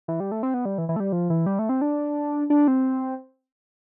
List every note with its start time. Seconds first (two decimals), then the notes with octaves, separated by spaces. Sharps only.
0.08 E3
0.20 G3
0.32 A3
0.43 C4
0.54 B3
0.65 G3
0.78 E3
0.89 E3
0.96 A3
1.00 G3
1.13 F3
1.30 E3
1.46 G3
1.59 A3
1.69 C4
1.81 D4
2.50 D4
2.68 C4